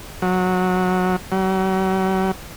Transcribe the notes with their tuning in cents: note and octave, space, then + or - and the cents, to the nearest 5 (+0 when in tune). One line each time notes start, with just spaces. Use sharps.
F#3 -15
F#3 +40